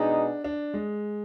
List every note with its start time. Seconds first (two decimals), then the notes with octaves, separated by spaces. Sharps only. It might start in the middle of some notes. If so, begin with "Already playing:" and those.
Already playing: B2 G#3 D4 D#4 G#4
0.44 D4
0.74 G#3